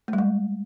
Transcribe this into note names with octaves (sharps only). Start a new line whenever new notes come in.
A3
G3
G#3